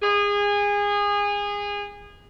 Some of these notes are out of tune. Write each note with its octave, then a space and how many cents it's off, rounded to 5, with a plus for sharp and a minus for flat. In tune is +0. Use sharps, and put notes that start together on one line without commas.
G#4 -25